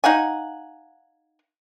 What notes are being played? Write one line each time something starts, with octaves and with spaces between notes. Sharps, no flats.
D#4 F5 F#5 G#5